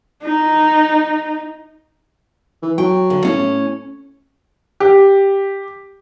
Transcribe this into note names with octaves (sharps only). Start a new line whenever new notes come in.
D#4
E3
F#3 G5
D3
A2 C#4
G4